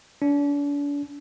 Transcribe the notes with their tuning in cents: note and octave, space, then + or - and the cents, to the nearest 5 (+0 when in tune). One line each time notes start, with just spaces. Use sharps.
D4 -40